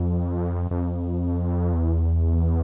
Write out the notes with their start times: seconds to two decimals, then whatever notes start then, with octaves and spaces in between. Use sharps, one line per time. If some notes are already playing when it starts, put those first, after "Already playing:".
Already playing: F2
0.71 F2
1.73 E2